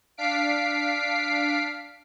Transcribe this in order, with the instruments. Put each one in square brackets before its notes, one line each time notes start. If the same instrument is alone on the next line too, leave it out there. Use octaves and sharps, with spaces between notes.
[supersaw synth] D4 F5 B6 C7 D7